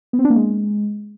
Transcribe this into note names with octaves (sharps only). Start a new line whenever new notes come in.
B3
C4
D4
A#3
G#3